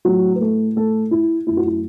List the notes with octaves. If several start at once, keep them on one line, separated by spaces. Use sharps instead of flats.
A2 F#3 A3 F#4
B4
A3 A4
A3 A4
E4
F#2 F#3 A3 E4
F#4
E4